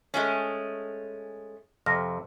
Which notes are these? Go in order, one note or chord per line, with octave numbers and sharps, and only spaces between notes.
G#3 A3 C#4
F2 C3 F6 A#6